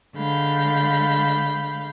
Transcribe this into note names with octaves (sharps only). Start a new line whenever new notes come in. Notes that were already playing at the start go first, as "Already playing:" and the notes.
D3 G#3 F5 B5 G6